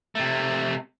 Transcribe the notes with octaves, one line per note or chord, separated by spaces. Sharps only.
C3 A3